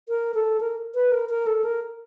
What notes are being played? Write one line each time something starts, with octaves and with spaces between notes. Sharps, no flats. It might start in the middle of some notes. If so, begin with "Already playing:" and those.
A#4
A4
A#4
B4
A#4
A#4
A4
A#4